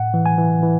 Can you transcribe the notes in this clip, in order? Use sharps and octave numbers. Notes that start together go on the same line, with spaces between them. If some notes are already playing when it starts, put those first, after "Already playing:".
Already playing: A2 F#5
E3
G#5
E3
E3